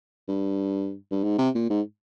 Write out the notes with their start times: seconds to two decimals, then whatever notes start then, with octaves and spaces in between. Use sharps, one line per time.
0.28 G2
1.11 G2
1.23 G#2
1.38 C3
1.55 A#2
1.70 G#2